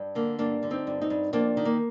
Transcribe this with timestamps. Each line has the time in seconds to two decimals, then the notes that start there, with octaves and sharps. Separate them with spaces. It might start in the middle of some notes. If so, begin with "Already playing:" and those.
Already playing: G2
0.15 D3 A#3
0.39 G2 A#3 D4
0.63 D3
0.70 C4 D#4
0.87 G2
1.01 C4 D#4
1.10 G2
1.33 F2 A#3 D4
1.57 D#3
1.65 A#3